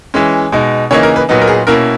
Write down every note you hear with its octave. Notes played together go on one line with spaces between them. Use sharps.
E3 G#3 C#4
B2 G#3 D#4
C#3 E3 A#3 D#4 C#5
A#4
B4
A#2 F#3 B3 D#4
A#4
G#4
B2 A#3 C#4 E4 A#4